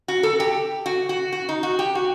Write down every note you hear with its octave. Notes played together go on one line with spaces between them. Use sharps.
F#4
A4
G4
F#4
F#4
F#4
D#4
F#4
G4
F#4